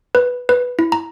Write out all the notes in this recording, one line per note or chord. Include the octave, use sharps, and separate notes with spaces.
B4
B4
E4
A#5